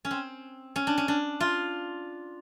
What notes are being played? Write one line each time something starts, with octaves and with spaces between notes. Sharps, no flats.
C#4
C4
C#4
D4
C#4
D4
F4